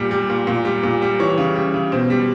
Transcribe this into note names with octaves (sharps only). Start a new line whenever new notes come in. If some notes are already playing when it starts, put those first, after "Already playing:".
Already playing: A#2 G3
G3
A#2
A#2
G3
A#2
G3
E3 C#5
C#3
G3
C#3
B2 C5
G3